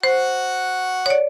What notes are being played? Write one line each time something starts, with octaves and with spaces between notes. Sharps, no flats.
F#4 C5 F#5
C#5
D5